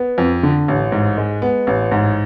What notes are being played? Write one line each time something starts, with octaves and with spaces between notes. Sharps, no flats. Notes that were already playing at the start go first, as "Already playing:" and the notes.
Already playing: B3
F2
D3
A1
G#2
G#3
B3
A1
G#2